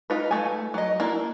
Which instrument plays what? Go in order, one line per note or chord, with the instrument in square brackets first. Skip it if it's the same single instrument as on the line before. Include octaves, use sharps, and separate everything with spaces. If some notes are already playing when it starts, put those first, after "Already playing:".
[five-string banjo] D#4 F4 B4
A3 G#5
F#3 D#5
A#3 D4 E4